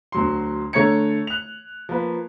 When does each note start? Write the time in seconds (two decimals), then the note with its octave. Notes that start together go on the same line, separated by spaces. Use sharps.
0.12 D2 F#3 C6
0.73 D3 A3 C#5 A#5 G#6 C#7
1.27 F#6 F7
1.89 F3 A#3 B4